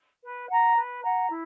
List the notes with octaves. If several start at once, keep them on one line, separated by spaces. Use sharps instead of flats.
B4
F#5 A#5
B4
F#5 A#5
E4